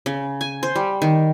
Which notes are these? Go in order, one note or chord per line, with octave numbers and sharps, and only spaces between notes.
C#3
G#5
C5
G3
D#3